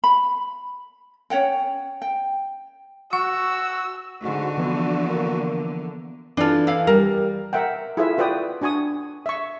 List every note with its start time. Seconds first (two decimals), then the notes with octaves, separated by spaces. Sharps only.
0.04 B5
1.30 C#4 C#5 F#5 G5
2.02 G5
3.13 F#4 F#5 C#6 E6
4.23 G#2 D3 F#4
4.58 E3 F3 B3 D4
5.07 A#3
6.37 E3 D4 F4 A4
6.67 E4 F5
6.87 G3 A#4
7.53 A#4 E5 F#5 G5
7.97 E4 F4 G#4 A4 B4 E5
8.18 F4 F#4 B4 D5 G5 D#6
8.62 D4 F#4 G#5 C#6 D#6
9.26 E5 C#6